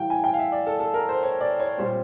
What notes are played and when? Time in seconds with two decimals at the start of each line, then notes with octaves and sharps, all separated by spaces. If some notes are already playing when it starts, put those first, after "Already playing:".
Already playing: A2 E3 G3 F5 G5
0.10 G#5
0.24 G5
0.34 F5
0.39 E5
0.52 D5
0.67 A4
0.80 A4
0.94 A#4
1.09 C5
1.23 C#5
1.41 D5
1.60 C#5
1.78 A#2 G3 C4 C5